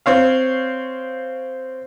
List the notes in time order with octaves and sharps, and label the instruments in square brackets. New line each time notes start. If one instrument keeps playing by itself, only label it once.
[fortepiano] C4 C#5 F5